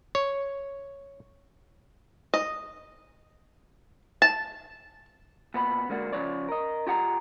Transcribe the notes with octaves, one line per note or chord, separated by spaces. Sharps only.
C#5
D#5
A5
A#2 B3 B5
D3 G#3 A#3 D4 F#4
C#3 F3 C#5 D5
A#4 D#5
F4 G4 G#4 F#5 G#5 A#5